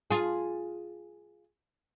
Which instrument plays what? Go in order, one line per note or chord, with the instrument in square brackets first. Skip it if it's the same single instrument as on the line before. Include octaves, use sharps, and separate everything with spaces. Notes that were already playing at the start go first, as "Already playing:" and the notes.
[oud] F4 G#4